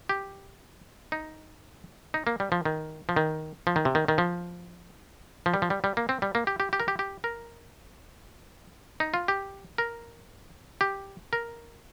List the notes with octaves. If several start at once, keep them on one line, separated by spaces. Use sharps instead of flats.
G4
D#4
D#4
A#3
G3
F3
D#3
F3
D#3
F3
D#3
C3
D#3
D#3
F3
F3
G3
F3
G3
G3
A#3
C4
G3
A#3
G4
G4
G4
A#4
G4
G4
A#4
D#4
F4
G4
A#4
G4
A#4